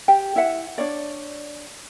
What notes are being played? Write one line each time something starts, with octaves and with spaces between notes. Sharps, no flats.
G4 G5
E4 E5 F#5
D4 C#5 D5